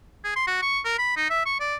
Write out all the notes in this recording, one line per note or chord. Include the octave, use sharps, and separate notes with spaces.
G#4
C6
F#4
C#6
A#4
B5
D#4
E5
C#6
D5